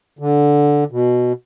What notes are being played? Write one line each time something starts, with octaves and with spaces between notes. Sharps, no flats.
D3
B2